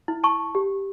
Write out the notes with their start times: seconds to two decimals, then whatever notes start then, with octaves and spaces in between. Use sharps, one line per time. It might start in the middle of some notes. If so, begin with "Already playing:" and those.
0.08 E4
0.24 A5 C#6
0.55 G4